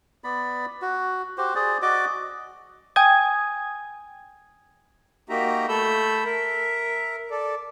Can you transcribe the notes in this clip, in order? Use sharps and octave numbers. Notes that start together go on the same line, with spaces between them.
B3 D5 B5
F#4
F#4 G4 C5
G#4 C5 D5
F#4 D5 D#5 D6
G5 G#5 D#6 G#6
A#3 D#4 F#4 G4 E5 A#5
A3 A4 B5 E6 G6
A#4 E5
A4 D5